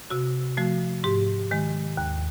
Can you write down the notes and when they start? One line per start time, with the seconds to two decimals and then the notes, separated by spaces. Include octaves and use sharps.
0.10 C3 F#4
0.57 F3 A3 F#4
1.04 G#2 G4
1.51 D#3 G#3
1.97 D#2